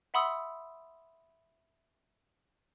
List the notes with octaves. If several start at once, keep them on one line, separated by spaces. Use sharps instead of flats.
E5 F#5 B5 C6 D#6 E6